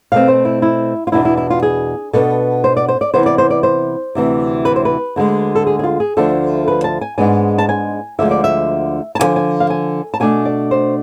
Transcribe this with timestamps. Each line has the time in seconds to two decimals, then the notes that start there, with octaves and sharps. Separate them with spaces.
0.12 B2 A3 C4 F5
0.28 C5
0.45 E4
0.62 E4
1.07 F4
1.12 E2 B2 B3 D4 E4
1.25 E4
1.37 E4
1.50 F4
1.63 G#4
2.13 B2 B3 D4 A4
2.64 C5
2.77 D5
2.88 C5
3.01 D5
3.14 C3 E3 B3 C5
3.26 D5
3.38 C5
3.50 D5
3.63 C5
4.15 D2 C3 E3
4.65 B4
4.76 C5
4.85 B4
5.16 D2 D3 G#3
5.55 A4
5.67 G#4
5.79 G#4
5.84 F4
6.00 G#4
6.17 D2 D3 F3 A3 D4 A4
6.68 B4
6.84 A5
7.01 G#5
7.18 G#2 G#3 B3 D4 G#5
7.58 A5
7.69 G#5
8.19 D2 D3 F3 G#3 E5
8.31 D5
8.44 E5
9.15 A5
9.19 E2 D3 F3 G#5
9.36 G#5
9.60 F5
9.70 G#5
10.14 A5
10.20 B2 A3 D4 G#5
10.45 D5
10.71 C5